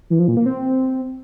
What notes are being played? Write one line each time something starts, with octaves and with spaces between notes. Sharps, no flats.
E3
F3
A#2
A#3
C4